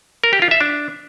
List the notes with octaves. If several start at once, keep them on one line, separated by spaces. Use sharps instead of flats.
A#4
G4
F4
E5
D4